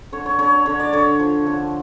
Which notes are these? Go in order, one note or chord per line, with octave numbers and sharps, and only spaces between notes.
D3 C#5
C#5
D3 C#5
D3 C#5
D5
D3 C#5
F3
D3